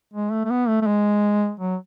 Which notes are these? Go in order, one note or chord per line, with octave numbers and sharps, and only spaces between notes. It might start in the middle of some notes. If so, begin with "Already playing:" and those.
G#3
A3
A3
B3
A3
A3
G#3
F#3